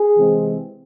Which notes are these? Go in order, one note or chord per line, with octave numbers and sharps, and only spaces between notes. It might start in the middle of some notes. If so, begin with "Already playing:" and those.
Already playing: G#4
C3 E3 G#3 C4